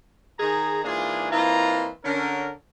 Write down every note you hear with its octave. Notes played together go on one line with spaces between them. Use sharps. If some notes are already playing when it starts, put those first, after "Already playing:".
D#3 G#4 A#5
G#2 E3 A#3 D4 F4 G#4
E3 A#3 C4 F4 D#5 A#5
D3 C#4 A#4